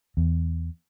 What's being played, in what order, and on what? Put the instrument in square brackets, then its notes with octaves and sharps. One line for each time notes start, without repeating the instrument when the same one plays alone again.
[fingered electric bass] E2